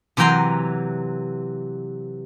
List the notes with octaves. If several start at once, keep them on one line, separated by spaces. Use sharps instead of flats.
C3 E3 F#3 G5 A#5 C6